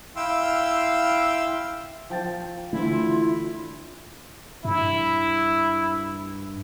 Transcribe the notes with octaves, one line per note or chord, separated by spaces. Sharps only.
E4 F5 G5 C6 E6
F3 G5 A6
D3 E3 A3 E4 F4
G2 E4